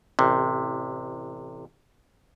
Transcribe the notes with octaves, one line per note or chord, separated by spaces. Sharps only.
A1 C3